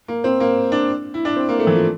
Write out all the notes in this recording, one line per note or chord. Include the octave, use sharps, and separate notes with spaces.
A#3
C4
A#3
D4
E4
D4
C4
A#3
A3
E3
F3